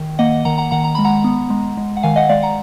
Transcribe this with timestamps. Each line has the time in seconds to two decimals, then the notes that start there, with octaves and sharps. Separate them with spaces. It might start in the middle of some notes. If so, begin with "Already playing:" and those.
Already playing: D#3
0.19 A#3 D#5 F#5
0.45 D#3 F#5 A#5
0.58 F#5 A#5
0.71 D#3 F#5 A#5
0.84 A#5
0.95 G#3 B5
1.05 F#5 A#5
1.24 B3
1.50 G#3
1.77 G#3
1.97 F#5
2.03 D#3 F5 G#5
2.16 D#5 F#5
2.29 G#3 D5 F5
2.42 F#5 A#5